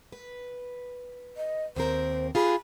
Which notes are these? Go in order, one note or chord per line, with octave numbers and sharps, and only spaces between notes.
B4
D#5
D#2 C4 A#4 C5
F4 G4 G#4 B5